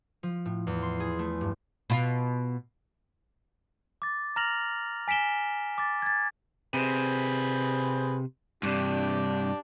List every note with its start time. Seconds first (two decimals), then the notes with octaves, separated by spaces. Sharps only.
0.23 F3
0.45 A2
0.67 E2
0.82 C6
1.00 G#4
1.19 A3
1.41 G2
1.90 B2 F4
4.02 D6 A6
4.36 A#5 F6 A#6 F7 F#7
5.08 G#5 B6 D7 E7 G7
5.78 D6 A6
6.02 G#6 A6
6.74 C3 G#4 B4 C5
8.63 G2 C3 D4 G4